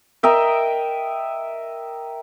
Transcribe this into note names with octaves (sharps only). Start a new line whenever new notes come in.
A#4 D#5 E5 G5